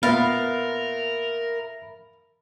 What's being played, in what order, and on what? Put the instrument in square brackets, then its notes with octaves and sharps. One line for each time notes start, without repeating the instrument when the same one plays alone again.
[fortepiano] A#2 B3 [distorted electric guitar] A#4 [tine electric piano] E5 B5 A6 [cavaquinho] F5